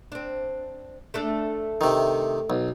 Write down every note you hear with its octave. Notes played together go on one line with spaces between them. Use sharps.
C4 D4
A3 D4 A4
C3 D#3
B1